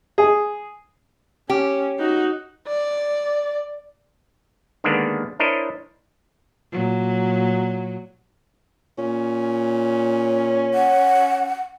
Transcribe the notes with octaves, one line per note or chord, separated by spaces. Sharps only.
G#4
C#4 G4
D#4 F#4
D5
D3 D#3 G#3 A#3 B3 D4
D4 E4 A#4 C5 C#5 D#5
A#2 F#3
A#2 C#4
F#5